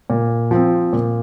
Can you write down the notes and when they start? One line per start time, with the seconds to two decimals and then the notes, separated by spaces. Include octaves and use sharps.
0.10 A#2
0.51 F3 C4
0.93 A#2